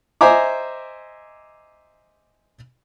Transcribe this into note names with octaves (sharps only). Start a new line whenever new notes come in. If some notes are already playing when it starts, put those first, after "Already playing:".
C5 D#5 E5 G#5 A#5 D6